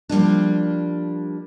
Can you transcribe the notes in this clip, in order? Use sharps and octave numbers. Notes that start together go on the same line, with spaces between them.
F3 G3 A#3 D4